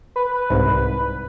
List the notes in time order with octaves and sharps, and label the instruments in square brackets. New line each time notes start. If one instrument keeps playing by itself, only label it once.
[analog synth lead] B4
[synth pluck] C2 G#2